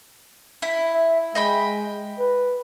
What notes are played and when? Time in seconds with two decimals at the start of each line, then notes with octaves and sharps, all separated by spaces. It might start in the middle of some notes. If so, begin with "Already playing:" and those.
0.62 E4
0.92 E5
1.35 G#3 D#5 G5 B5
2.19 B4